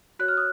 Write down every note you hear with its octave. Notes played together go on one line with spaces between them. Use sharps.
F#4 C#5 F#6
F6
D#6